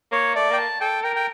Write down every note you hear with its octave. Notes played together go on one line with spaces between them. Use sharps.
A#3 C#5
A3 D5
A#3 G5
A5
A4 G5
A#4 G5
G5